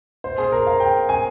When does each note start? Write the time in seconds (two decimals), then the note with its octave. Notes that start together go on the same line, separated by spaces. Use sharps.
0.24 C5
0.38 G#4
0.52 A#4
0.67 F5
0.80 G5
1.09 G#5